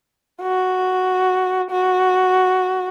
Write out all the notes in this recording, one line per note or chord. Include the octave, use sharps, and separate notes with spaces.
F#4
F#4